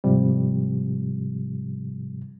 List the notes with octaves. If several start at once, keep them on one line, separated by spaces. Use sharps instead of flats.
G#2 C3 F3 G3